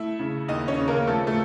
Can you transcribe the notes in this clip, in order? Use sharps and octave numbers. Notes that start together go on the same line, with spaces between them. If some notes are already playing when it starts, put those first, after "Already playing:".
Already playing: A3 E4 E5
C#3
D#2 D#4 D#5
C#4 C#5
C#3
A#3 A#4
F3 A3 A4
A3 A4